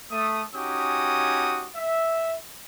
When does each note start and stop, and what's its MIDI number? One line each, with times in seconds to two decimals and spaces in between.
0.11 0.42 57
0.11 0.42 87
0.55 1.69 61
0.55 1.69 63
0.55 1.69 66
0.55 1.69 67
0.55 1.69 80
0.55 1.69 87
1.76 2.37 76